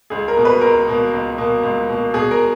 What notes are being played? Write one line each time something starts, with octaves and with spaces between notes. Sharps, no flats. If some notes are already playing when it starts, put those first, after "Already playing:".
C#2 G#4
A#4
B2 A#3
B4
C#2 A#4
B2 A#3
C#2
B2 A#3
C#2
B2 A#3
B2 G#4
A#4